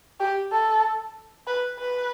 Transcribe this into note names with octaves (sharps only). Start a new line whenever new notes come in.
G4
A4
B4
B4